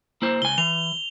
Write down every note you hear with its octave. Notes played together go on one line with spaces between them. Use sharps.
A#3 E4 C5
C#2 G#5 G7
E3 F7